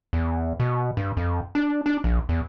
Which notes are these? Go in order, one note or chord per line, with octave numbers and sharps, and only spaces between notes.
E2
B2
G2
F2
D4
D4
A#1
E2